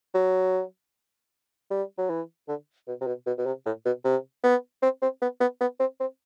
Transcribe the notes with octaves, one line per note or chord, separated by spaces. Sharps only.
F#3
G3
F#3
E3
D3
B2
C3
B2
B2
B2
C3
A2
B2
C3
B3
C4
C4
B3
B3
B3
C4
C4